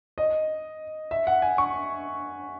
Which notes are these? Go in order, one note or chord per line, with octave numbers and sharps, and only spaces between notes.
D#5
E5
F#5
G#5
C#6